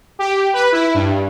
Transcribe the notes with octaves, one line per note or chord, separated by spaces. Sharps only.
G4
B4
E4
G2